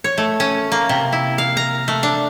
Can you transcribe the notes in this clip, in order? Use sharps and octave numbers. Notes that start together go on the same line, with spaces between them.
C#5
A3
C#4
A#3
C3
E4
F5
A#5
A3
D4